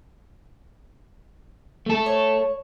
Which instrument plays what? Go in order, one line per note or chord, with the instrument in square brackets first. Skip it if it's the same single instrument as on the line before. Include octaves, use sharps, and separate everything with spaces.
[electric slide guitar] A3 A4
[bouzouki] C#5